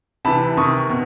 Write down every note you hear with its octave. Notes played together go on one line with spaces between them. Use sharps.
C3 E3 A5 B5
C3 D#3 C#6 D#6
B2